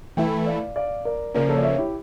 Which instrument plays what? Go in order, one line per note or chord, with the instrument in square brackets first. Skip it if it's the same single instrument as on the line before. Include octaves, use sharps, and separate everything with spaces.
[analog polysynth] E3 A3 E4 [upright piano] E5 G5
[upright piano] D5 F5
D5 F5
A#4 D5
[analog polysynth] C#3 F3 A#3 C#4 [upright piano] A#4 D5
[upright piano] A4 C#5
D5
C#5 E5
E4 G4